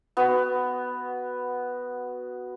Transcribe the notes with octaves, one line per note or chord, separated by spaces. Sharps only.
B3 F#4